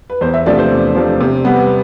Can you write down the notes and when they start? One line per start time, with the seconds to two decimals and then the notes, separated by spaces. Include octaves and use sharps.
0.10 B4
0.21 E2 C5
0.34 E5
0.46 C3 F3 A3 D4 D5
0.59 C5
0.71 E2
0.95 C3 F3 A3 D4
1.21 C3
1.45 G3 B3